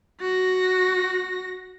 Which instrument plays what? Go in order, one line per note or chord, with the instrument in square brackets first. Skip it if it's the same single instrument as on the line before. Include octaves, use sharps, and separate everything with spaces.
[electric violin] F#4 A#6